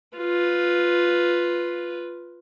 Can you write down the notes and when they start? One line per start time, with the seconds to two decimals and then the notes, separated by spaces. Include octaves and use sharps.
0.18 F4 B4